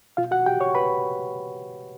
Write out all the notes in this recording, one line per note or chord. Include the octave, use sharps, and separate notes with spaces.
B2 F4 F5
F#4 F#5
G4 G5
C#5 C#6
B4 B5